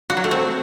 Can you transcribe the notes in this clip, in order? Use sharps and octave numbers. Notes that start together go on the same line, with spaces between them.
F#4
F#3
A3
C4